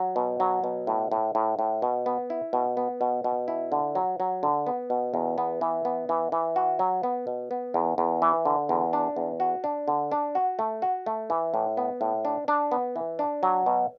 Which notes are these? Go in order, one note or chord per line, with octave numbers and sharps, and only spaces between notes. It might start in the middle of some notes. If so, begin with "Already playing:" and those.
Already playing: F#3
B2
F#3
B2
A2
A2
A2
A2
B2
B3
E4
B2
B3
B2
B2
E4
D3
F#3
F#3
D3
B3
B2
E2
B3
E3
B3
E3
E3
F#4
F#3
B3
B2
B3
E2
E2
E3
D3
E2
D4
E2
F#4
D4
D3
D4
F#4
A3
F#4
A3
E3
A2
B3
A2
D4
D4
B3
E3
D4
F#3
B2